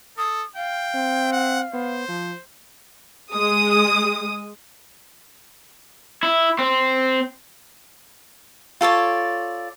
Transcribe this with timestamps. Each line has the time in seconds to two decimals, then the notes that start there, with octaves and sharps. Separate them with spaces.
0.18 A4 D#6
0.56 F5 G5
0.94 C4
1.32 F#5
1.74 B3 C5
2.08 F3
3.34 G#3 D#6
6.23 E4
6.59 C4
8.81 F4 A4 C#5 D5